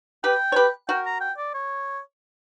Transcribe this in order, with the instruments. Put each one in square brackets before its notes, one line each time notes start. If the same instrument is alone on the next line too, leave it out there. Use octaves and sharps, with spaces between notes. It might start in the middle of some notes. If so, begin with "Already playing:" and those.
[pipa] G4 B4 [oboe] G5
[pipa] C#5
G4 B4
[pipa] F#4 A#4 [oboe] G5
[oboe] A#5
G5
D5
C#5